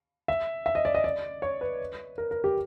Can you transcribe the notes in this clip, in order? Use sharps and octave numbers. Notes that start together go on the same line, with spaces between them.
E5
E5
D#5
D5
D#5
D5
C#5
B4
A#4
A#4
G4